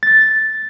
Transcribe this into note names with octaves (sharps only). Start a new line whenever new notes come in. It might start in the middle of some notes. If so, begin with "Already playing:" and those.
A6